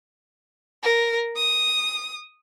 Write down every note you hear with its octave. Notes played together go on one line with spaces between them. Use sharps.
A#4
D#6